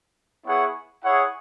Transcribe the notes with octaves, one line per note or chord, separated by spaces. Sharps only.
B3 E4 G#4 C#5 F#5
E4 G#4 C#5 F#5